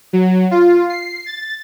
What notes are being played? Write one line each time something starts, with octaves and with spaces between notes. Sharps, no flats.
F#3
F4
C7
A6